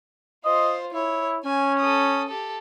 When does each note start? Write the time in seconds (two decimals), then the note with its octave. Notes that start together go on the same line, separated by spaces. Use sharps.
0.45 F4 C5 D#5
0.94 E4 C#5
1.45 C#4 G#5
1.80 A4 D#6
2.28 G4 A4